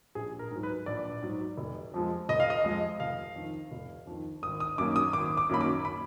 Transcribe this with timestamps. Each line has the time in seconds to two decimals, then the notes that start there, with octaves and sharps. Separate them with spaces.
0.15 A#1 G#4
0.39 A#4
0.51 G#2 F#3
0.63 B4
0.86 A#1 D5
1.23 G#2 F#3
1.58 F1
1.94 F2 F3 G#3
2.29 F1 D#5
2.40 F5
2.50 D#5
2.64 F2 F3 G#3
3.00 F1 F5
3.36 F2 D#3
3.72 F1
4.07 F2 D#3
4.43 G#1 D#6
4.60 D#6
4.78 F#2 D#3 F#3 A#3 D6
4.96 D#6
5.13 G#1 D6
5.37 D6
5.49 F#2 D#3 F#3 A#3 B5
5.61 D6
5.85 B5